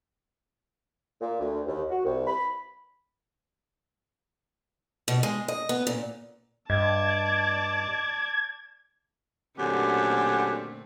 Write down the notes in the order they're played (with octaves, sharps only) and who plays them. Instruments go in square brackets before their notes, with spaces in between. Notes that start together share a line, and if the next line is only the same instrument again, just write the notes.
[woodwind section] A#2
D2
D#2
F#4
C2
B5
[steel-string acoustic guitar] B2
G#3
D#5
B3
A#2
[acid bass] G2 [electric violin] D5 A5 [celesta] D#5 [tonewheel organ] G#6
[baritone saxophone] F#2 [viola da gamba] A#2 A3 C4 [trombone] D3 [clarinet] G4